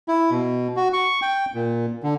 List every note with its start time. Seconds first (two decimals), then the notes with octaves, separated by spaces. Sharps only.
0.08 E4
0.31 B2
0.76 F#4
0.93 C#6
1.22 G5
1.54 A#2
2.03 D3